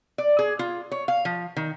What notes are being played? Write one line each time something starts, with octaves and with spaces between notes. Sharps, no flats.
D5
G#4
F4
C#5
F5
F3
D#3